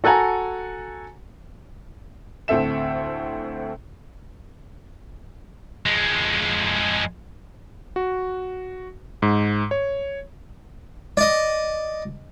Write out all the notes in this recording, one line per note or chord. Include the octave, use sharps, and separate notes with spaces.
F#4 A4 F#5 G#5 A#5
D2 A2 C4 A4 E5 E7
F2 G#3
F#4
G#2
C#5
D5 D#5